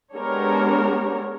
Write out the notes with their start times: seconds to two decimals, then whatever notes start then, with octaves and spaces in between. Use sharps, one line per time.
0.15 G#3 B3 D4 G4 A#4 C#5